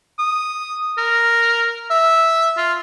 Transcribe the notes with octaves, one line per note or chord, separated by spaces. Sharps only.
D#6
A#4
E5
F4